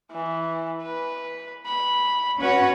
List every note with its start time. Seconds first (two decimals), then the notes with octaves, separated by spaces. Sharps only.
0.12 E3
0.82 B4
1.66 B5
2.40 C#4 F#4 B4 C#5